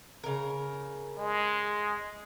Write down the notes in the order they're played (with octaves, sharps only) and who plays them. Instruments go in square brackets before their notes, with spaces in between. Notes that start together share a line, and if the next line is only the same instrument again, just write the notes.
[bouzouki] C#3 A#4
[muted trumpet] G#3